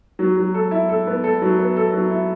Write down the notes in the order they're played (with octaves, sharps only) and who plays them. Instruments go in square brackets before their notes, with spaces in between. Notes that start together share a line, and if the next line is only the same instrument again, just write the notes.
[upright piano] F#3
F#3
A4
E4
A4
B3
A4
F#3
B3
A4
F#3
E4